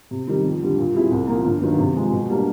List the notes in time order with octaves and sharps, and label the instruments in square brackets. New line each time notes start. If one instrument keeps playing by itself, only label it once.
[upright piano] C3
D#3 G3
F2
D3 G3
A#2
G3 C4 E4 G#4
C2
A#2 F3 A#3
G1
G2 D#3 F#3 B3
C3
F3 G#3
B2
G3 A#3 D4